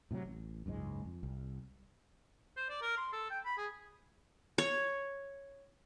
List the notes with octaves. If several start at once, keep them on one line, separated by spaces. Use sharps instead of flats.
A2 C3 F3 F#3
A1
F#1 C#2 G#2 G#3
F2
C2
C5
D5
A#4
C6
A4
G5
B5
G#4
C#5